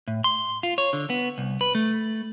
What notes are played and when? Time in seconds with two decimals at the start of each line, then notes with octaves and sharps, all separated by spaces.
0.08 A2
0.24 C6
0.63 F4
0.78 C#5
0.93 D3
1.10 B3
1.38 C2
1.61 B4
1.75 A3